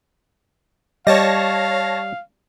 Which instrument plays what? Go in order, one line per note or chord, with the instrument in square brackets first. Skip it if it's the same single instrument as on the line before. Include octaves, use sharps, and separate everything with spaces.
[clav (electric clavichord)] G3 [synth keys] C#5 A5 A#6 [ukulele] D#5 [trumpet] F5